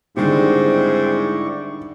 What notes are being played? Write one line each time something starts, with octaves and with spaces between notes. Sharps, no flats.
G#2 D3 D#3 G3 C4 E4 D5 C#6